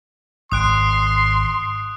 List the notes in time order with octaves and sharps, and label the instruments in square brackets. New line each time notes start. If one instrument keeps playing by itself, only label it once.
[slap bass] G#1 [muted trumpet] C6 [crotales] D#6 F#6 D7